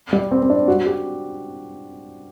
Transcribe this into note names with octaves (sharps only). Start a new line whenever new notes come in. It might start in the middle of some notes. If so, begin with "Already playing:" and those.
G3
C4
C4
D4
F#4
G4